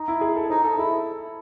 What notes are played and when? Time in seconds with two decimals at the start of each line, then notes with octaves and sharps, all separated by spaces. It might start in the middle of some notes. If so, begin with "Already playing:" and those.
Already playing: D#4
0.08 E4
0.21 G#4
0.36 A4
0.50 D#4 C5
0.64 D#4 A4
0.78 E4 G#4